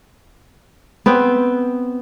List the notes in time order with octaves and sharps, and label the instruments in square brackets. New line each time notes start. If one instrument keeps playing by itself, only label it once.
[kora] B3 C4